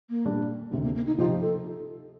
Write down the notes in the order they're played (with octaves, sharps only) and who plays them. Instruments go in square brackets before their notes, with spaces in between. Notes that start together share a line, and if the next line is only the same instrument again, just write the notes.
[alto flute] A#3
[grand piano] A#2 G3 D4 G4
[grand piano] D2 C3 D#3 [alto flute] A3
[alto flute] A#3
A#3
D#4
[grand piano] C3 F3 C4 D#4 G4 [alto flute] F4
[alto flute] A4